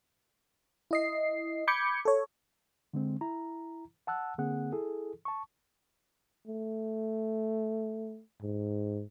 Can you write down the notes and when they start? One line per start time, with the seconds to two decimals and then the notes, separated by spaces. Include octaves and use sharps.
0.91 E4 D#5 C7
1.67 B5 D6 G6 G#6 C#7
2.05 A4 C#5
2.94 D3 G#3 C4
3.21 E4 A#5
4.07 F#5 A5 E6 F#6
4.38 D3 A#3 C4 G#4 F#5 F#6
4.72 E4 G#4 A4
5.25 A5 C#6
6.47 A3
8.41 G#2